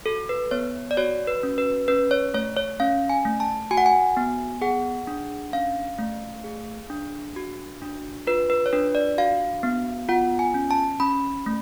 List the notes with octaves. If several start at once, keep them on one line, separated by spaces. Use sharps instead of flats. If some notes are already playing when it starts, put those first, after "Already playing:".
F#4 A4
B4
B3 C#5
D5
F#4 C#5
B4
C#4
B4
C#4 B4
C#5
A3 C#5
C#5
C#4 F5
G#5
A3
A5
F#4 G#5
F#5
G#5
B3
G#4 F#5
D4
C#4 F5
A3
G#4
D4
F#4
D4
F4 B4
B4
C#5
D4 B4
D5
F#4 F5
B3
F4 F#5
G#5
C#4
A5
C#4 B5
A3